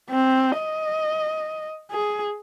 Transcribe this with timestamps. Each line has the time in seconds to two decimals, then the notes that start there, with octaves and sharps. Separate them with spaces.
0.10 C4
0.57 D#5
1.91 G#4